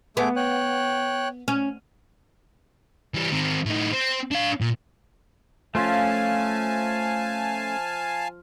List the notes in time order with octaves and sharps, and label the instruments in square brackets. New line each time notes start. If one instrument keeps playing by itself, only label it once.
[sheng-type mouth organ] A3 G#4 D6 [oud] B3
[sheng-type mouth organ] C#5 G5 F#6
[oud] C#4
[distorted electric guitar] E3 G3
D#3 C4
A2 D#4
C4
D4 F5
A#2
[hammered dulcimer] F3 F4 [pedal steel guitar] A3 C#4 [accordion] F5 G#5 A5